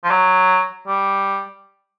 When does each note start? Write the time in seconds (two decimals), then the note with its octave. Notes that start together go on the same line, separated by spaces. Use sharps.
0.04 F3
0.11 F#3
0.88 G3